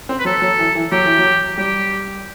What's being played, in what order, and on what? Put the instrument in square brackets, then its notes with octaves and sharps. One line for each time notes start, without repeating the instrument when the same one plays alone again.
[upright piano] C4
[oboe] B4
[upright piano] F#3 [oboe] A4
[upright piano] F#3
E3
E3
[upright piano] F#3 [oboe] G4
[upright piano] E3
F#3
[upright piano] G3 [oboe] G4